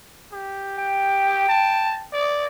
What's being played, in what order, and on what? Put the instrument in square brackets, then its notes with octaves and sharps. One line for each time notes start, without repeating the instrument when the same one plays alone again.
[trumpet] G4
[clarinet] G5
[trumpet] A5
D5